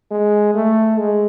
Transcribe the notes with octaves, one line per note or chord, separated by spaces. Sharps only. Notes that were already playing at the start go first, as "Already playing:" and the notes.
G#3
A3
G#3